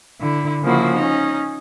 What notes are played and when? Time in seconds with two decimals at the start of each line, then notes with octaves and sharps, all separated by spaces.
0.21 D3 E4
0.62 C#3 F3 A#3 E4 F#4
0.96 C#4 D#4